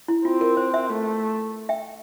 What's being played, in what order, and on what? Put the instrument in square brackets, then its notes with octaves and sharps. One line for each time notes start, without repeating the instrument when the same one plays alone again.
[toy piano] E4
[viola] C4 [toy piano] F4
[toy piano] A#4
C5
C5 E5
[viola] A3
[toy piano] E5 G5